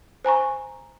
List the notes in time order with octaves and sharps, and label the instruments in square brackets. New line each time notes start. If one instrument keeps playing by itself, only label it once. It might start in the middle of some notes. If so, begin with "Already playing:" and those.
[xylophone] C5 G#5 A#5 C#6